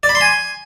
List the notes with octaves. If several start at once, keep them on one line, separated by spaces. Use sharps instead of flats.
D5
B5
C6
G#5